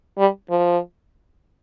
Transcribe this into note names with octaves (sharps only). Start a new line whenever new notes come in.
G3
F3